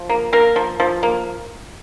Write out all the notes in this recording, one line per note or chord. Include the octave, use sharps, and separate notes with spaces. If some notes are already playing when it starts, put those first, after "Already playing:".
Already playing: F3
A#3
A#3 A#4
F3
F3
A#3